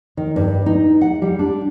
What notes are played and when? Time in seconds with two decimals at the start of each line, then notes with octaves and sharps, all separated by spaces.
0.17 D#3
0.36 G2
0.66 D#4
1.01 F#5
1.22 G3
1.39 D4